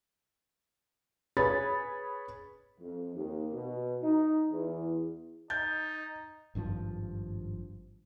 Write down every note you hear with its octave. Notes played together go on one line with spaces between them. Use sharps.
G#4 B4 C#5 B5 A6
F2
D#2
B2
D#4
E2
D#4 G6 A6
G#1 G2 C#3 F3